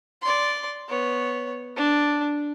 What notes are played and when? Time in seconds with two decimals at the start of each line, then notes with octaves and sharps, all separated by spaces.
0.22 D5 C6
0.88 B3 C#5
1.76 D4